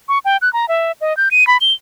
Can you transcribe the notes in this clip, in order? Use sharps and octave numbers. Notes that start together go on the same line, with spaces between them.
C#6
G5
F#6
A#5
E5
D#5
G6
D#7
B5
G7